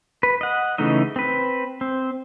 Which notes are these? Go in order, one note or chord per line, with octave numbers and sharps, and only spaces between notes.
B4
D#5 F#5
C#3 E3 A3 D#4 D#5
C4 B4
C4